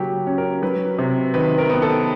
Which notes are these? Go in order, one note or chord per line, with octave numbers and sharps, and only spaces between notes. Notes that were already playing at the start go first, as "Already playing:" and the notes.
Already playing: C#3 F#3 A#3 G4
C#4
A#4
F#3 B4
C3
D#3 B4
A#4
B3
A4